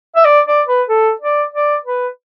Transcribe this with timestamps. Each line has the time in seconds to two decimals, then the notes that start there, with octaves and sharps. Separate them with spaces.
0.15 E5
0.25 D5
0.47 D5
0.68 B4
0.89 A4
1.21 D5
1.54 D5
1.85 B4